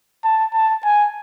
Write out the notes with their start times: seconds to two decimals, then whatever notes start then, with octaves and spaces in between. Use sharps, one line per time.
0.24 A5
0.54 A5
0.84 G#5